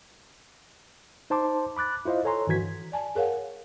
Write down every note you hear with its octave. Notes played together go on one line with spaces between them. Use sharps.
D#4 C5 A5 C6 D6
B5 D6 F#6 A6
E4 F4 C5 D#5 F5
A4 C#5 G#5 A#5 C6
G2 D#3 E3 F#4 G#6 B6
D5 G#5 A5
G#4 A#4 C#5 F5 F#5